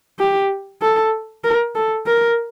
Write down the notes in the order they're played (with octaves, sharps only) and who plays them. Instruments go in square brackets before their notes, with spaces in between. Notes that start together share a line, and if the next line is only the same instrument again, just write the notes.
[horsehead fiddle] G4
A4
A#4
A4
A#4